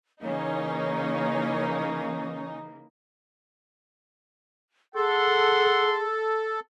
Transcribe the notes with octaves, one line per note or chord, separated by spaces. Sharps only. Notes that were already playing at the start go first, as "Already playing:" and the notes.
C#3 E3 A#3 C#4 D#4
G#4 A4 F#5 C6